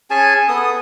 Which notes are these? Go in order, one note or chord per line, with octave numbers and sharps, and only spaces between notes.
C#4 G#4 G#5 A5
B3 A4 D#6